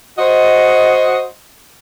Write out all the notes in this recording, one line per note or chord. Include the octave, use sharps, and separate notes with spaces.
F#4 C5 D#5